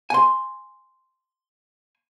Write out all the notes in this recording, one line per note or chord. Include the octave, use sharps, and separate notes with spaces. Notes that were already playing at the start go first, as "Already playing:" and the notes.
G#5 C6